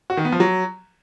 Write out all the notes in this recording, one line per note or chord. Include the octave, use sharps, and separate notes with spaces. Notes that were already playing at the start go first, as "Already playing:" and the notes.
F#4
D#3
B3
F3
F#3